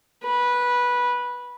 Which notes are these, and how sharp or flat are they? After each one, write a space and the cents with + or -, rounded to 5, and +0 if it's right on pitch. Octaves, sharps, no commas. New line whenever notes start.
B4 -15